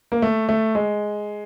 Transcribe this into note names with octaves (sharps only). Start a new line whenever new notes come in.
A#3
A3
A3
G#3